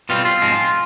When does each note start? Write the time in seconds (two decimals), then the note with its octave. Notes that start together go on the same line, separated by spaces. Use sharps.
0.09 B2 G3 C4 F4
0.25 F4
0.42 G#2 F3 G#3 C4